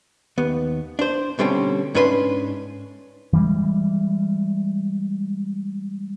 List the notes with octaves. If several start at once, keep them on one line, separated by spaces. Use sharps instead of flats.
D#2 B3
D4 C5
B2 D3 G3 C4 C#4
G#2 C#4 D4 B4 C#5 C6
E3 G3 G#3